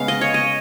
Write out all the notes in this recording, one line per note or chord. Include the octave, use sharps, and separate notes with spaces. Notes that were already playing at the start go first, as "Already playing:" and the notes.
Already playing: C#3 G#3 B3 F5
D#5
C#5
D#5